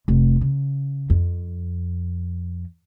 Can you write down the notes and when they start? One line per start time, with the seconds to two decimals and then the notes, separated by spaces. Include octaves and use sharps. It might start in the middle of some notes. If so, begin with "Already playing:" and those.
0.08 F1
0.41 C#3
1.10 F2